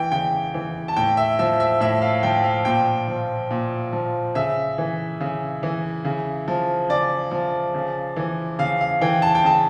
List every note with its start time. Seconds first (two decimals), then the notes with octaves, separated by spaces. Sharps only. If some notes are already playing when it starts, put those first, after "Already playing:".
Already playing: E3 G5
0.12 C#3 G5
0.54 E3
0.88 A5
0.96 A2 G5
1.17 E5
1.39 F3 E5
1.60 E5
1.80 A2 E5
2.02 F5
2.23 F3 G5
2.44 F5
2.65 A#2 G5
3.08 F3
3.51 A#2
3.93 F3
4.35 C#3 E5
4.78 E3
5.20 C#3
5.63 E3
6.05 C#3
6.48 F3
6.89 C#3 D5
7.31 F3
7.74 C#3
8.16 E3
8.59 C#3 F5
8.81 F5
9.01 E3 G5
9.22 A5
9.35 G5
9.44 C#3 A5